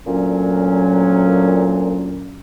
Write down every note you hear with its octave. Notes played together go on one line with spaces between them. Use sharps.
D2 A#2 F#3 C#4